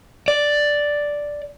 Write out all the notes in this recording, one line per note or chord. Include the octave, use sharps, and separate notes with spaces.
D5